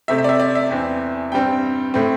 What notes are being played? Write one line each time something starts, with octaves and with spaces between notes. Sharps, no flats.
C3 A3 C4 E5
E5
D5
E5
D5
E5
E2 E3 C4
G2 G3 C4 G5
A2 A3 C4